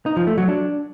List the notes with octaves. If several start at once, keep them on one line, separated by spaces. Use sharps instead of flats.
D#4
F3
A3
F#3
D4